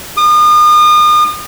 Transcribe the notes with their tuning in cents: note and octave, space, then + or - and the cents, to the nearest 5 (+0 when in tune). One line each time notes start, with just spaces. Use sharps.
D#6 -40